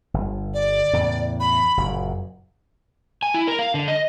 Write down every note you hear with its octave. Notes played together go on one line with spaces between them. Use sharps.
G1
D5
E2 A2 C#3
B5
F#1 F#2 A#2
G#5
E4
A#4
F5
D3
D#5